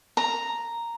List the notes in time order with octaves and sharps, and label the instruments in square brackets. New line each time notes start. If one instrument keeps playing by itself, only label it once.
[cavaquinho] A#5